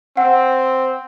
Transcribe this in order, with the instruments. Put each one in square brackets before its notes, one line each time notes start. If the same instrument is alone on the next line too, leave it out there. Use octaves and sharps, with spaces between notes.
[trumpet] C4 [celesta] F#5